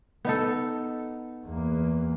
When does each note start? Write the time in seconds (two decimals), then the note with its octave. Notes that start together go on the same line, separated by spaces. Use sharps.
0.25 B3 D#4 A4
1.47 E2 A#3